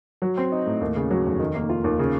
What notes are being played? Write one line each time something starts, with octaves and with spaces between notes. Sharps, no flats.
F#3
C4
D#4
A2
D#2
C#3
F#3
F1
D#3
A#3
F4
D#2
C#3